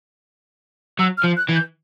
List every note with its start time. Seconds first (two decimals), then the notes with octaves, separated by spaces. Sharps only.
0.99 F#3 E6
1.18 F6
1.23 F3
1.37 F#6
1.49 E3
1.55 G6